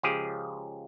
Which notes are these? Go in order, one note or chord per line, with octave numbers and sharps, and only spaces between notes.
C#2 F3 G4 G#4